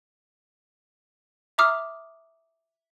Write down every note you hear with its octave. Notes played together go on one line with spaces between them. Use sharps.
E5 A#5 D6 D#6 F6